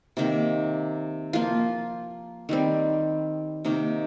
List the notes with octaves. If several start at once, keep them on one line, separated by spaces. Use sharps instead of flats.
C3 D#3 A#3
F3 A#3 F4
D#3 G3 C4
C3 D#3 A#3 D#4